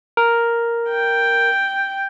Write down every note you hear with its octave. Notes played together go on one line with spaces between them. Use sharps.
A#4
G5